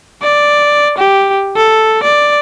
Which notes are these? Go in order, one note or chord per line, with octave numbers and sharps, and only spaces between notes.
D5
G4
A4
D5